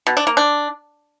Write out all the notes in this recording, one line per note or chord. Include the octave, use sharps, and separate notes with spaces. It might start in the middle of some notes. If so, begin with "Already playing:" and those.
B2
D4
A#3
D4